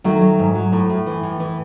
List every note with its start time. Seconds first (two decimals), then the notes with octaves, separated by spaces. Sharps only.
0.04 D#3 F#3 A3
0.21 F#3
0.39 G#2
0.55 F#3
0.72 A2
0.90 A2
1.06 E3
1.23 A2
1.40 E3